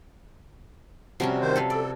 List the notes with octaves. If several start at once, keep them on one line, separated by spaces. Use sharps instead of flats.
C3 F3 G3 C#4 F#4 A#4
D#3 C5
A4 B4 F5
A4 D5